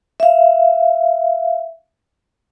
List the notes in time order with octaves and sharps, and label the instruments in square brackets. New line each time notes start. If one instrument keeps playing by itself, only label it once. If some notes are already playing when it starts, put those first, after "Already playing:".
[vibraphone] E5 F5